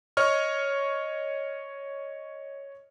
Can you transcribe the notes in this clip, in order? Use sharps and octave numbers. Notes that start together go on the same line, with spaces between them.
C#5 D#5 C#6 F6